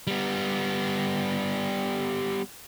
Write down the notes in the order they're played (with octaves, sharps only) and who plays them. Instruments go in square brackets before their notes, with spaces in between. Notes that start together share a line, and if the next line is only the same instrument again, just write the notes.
[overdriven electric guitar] G3 B3